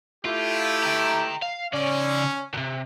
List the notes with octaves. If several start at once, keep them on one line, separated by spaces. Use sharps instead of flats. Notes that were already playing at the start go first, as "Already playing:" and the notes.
A3 E4 F4 G4
G5 A#5
F5
C#3 C#4 D5
D2 C3